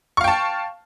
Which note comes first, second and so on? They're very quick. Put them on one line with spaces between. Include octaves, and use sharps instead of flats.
C#6 F5 G5 A5